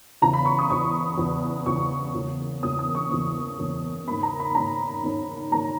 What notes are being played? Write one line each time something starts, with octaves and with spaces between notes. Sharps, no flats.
E2 C#3 E3 A#5
B5
C#6
D#6
E2 C#3 E3 C#6
E2 C#3 E3
E2 C#3 E3 C#6
E2 C#3 E3 A#3 C#4
E2 C#3 E3 A#3 C#4 D#6
D#6
C#6
E2 C#3 E3 A#3 C#4
E2 C#3 E3 A#3 C#4
G#2 D#3 A#3 C#4 B5
A#5
B5
G#2 D#3 A#3 C#4 A#5
G#2 D#3 A#3 C#4
G#2 D#3 A#3 C#4 A#5